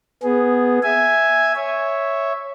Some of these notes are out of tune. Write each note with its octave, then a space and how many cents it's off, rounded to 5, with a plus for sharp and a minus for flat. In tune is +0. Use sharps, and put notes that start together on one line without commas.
B3 +0 G#4 +0
E5 +0 G#5 +0
C#5 +0 E5 +0